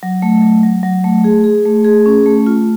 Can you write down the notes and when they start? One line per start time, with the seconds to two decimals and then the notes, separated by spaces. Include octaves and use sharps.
0.03 F#3
0.22 A3
0.42 F#3
0.63 F#3
0.83 F#3
1.04 A3
1.24 G#4
1.44 G#4
1.65 A3
1.84 G#4
2.06 C#4
2.26 A3
2.47 F4